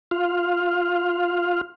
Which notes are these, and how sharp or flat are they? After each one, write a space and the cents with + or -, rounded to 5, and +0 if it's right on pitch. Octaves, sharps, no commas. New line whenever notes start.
F4 +10 F5 +0